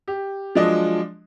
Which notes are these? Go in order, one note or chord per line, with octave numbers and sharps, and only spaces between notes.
G4
F3 F#3 G#3 D4 D#5